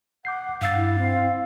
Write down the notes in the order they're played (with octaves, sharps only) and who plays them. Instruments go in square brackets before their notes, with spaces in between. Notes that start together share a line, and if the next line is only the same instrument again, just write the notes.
[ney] F#5 [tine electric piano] D6 G6 C7
[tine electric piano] G2 E6 A6 [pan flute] F5
[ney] E4
C4